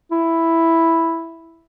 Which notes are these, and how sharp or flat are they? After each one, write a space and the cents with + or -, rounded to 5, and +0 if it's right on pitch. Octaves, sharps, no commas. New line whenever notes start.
E4 +0